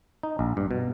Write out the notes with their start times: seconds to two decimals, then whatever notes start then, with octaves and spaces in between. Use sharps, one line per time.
0.23 D#4
0.39 A#1
0.57 G2
0.71 B2